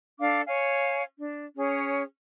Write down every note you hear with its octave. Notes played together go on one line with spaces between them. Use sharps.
D4 A4 F5 D6
C#5 F5 G#5
D4
C#4 G#4 C#5